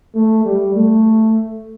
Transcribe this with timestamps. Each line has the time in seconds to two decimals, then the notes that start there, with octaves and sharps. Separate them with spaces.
0.14 A3
0.45 G3
0.75 A3